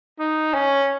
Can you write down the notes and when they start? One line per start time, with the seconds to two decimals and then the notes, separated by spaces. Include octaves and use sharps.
0.19 D#4
0.54 C#4